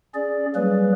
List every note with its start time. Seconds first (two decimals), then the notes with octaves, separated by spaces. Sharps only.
0.14 C#4 G#4 D5
0.55 F#3 G3 A#3 G#4 B4